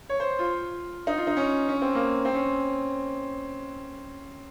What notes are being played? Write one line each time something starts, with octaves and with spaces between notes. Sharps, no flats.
C#5
C5
F4
D#4
F4
D#4
C#4
C#4
C4
A#3
C4
C#4